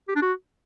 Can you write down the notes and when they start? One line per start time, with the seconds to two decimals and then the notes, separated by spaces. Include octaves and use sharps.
0.08 G4
0.15 D4
0.22 F#4